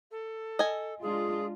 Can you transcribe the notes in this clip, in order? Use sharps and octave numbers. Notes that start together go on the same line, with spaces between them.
A4
D#5 G#5
G#3 D4 F4 G#4